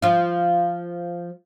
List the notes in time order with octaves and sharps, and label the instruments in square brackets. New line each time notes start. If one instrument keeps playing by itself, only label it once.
[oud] F3 F4